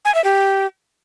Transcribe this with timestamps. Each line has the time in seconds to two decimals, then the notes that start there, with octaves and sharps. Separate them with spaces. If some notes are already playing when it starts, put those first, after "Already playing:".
0.05 G#5
0.15 E5
0.24 G4